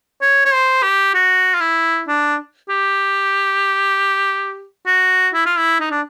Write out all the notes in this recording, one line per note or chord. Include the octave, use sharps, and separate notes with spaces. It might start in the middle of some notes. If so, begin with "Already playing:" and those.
C#5
C#5
C5
G4
F#4
F4
E4
D4
G4
F#4
E4
F4
E4
D#4
D4